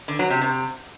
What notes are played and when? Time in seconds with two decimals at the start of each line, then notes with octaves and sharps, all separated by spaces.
0.08 D3
0.19 F#3
0.30 C3
0.41 C3